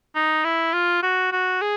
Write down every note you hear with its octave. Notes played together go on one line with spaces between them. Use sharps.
D#4
E4
F4
F#4
F#4
G#4